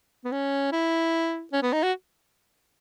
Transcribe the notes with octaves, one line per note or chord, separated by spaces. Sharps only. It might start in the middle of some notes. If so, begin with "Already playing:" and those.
B3
C#4
E4
C#4
B3
D#4
F#4